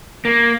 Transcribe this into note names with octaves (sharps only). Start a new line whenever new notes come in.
A#3